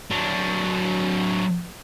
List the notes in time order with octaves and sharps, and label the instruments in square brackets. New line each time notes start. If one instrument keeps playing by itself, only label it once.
[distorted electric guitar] F#3 D4